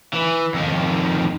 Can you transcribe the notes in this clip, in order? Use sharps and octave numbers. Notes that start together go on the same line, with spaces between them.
E3
F2 D#3